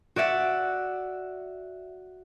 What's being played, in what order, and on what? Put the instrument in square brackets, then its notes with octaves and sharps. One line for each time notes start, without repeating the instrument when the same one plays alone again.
[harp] F#4 D5 E5 F#5 F#6